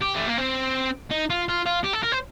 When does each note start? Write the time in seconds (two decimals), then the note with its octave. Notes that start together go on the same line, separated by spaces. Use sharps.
0.02 G4
0.16 A3
0.28 A#3
0.38 C4
1.11 D#4
1.30 F4
1.49 F4
1.66 F4
1.84 G4
1.93 A4
2.03 A#4
2.12 C5